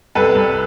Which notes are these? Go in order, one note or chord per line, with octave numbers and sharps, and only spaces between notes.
C2 A4 B4
C2